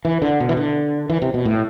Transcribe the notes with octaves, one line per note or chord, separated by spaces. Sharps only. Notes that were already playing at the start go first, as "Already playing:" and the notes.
E3
D3
B2
E3
D3
E3
C3
B2
A2